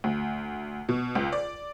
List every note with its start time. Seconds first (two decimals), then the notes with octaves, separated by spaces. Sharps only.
0.04 D2
0.89 B2
1.15 C#2
1.32 D5